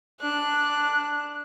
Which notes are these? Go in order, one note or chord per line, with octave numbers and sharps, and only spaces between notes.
D4 F#6